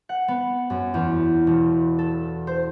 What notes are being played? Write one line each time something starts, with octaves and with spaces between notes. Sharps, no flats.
F#5
B3
F#2
E2
E1
A4
C5